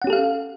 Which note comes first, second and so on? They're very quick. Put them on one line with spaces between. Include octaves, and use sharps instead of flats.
F#5 C#4 G4 A4 F5